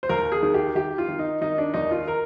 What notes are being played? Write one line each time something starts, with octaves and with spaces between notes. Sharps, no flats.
C5
D#2 A#4
G#4
D#3
G4
D#3 G4
F4
D#3
D#4
D#3 D#4
D4
D#2 D#4
F4
A#4